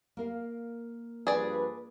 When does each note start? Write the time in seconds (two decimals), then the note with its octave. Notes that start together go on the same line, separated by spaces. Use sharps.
0.17 A#3 A#4 F5
1.27 G2 F3 G#4 B4 D5